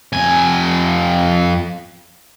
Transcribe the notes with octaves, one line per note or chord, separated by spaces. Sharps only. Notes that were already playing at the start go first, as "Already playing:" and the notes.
F2 G#5